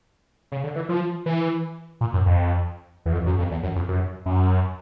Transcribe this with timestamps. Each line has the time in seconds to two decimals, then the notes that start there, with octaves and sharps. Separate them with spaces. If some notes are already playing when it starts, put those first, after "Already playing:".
0.52 C#3
0.63 D3
0.76 E3
0.89 F3
1.26 E3
2.01 A#2
2.14 F#2
2.26 F2
3.06 E2
3.13 F2
3.26 F#2
3.39 F2
3.51 E2
3.63 F#2
3.76 F2
3.88 F#2
4.26 F#2